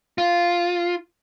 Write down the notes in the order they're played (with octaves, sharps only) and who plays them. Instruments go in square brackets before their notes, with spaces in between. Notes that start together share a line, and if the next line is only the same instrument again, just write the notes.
[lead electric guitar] F4